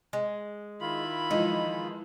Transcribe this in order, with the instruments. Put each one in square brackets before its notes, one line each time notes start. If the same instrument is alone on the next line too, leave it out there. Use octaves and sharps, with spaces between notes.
[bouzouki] G#3
[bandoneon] D#3 F4 [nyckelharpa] E4 B5
[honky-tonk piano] E3 F3 G#3 [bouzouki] D#4